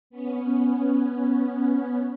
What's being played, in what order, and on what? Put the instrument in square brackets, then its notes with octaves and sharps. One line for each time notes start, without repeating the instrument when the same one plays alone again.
[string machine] B3 C#4